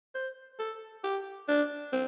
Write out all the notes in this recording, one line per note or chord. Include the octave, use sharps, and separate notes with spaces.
C5
A4
G4
D4
C4